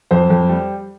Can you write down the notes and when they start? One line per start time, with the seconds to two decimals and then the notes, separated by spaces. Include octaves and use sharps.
0.11 F2 C5
0.30 F2
0.49 G3